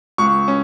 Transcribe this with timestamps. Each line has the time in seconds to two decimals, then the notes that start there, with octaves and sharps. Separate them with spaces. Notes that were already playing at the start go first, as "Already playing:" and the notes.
0.18 C#2 C#6
0.48 C#4